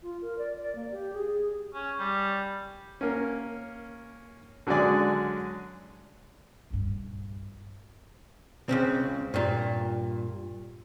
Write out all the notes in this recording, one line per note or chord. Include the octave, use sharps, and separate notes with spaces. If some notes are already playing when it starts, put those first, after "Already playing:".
F4
A#4
D5
D5
A#3
G4
G#4
C#4
G3
A#3 C#4
D3 F#3 G#3 C#4 D5 G#5
A#1 G2
C#2 C#3 C4
G2 A#2